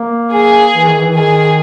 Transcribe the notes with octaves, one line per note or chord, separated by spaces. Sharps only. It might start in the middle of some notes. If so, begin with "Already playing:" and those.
Already playing: A#3
G#4
E3
D#3
E3
D#3 G#4